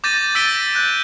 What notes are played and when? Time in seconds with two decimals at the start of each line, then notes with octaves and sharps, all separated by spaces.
0.04 D6 G6 A6 A#6 D#7
0.35 E6 A6 B6 D7 D#7 G7
0.75 F#6 G6